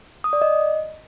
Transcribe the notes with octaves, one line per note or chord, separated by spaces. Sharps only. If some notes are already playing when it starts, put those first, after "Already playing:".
D#6
D5
D#5